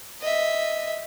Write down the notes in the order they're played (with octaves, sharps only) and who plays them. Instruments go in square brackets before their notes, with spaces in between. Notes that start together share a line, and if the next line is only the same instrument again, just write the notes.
[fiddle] D#5 E5